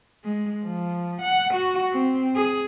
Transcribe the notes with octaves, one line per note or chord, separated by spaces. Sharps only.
G#3
F3
F#5
F#4
C4
G#4